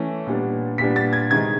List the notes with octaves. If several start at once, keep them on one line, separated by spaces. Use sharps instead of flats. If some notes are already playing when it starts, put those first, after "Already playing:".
Already playing: E3 A3 C#4
A#2 G3 B3 D4
A#2 G3 B3 D4 B6
A6
G#6
C3 D#3 G#3 G#6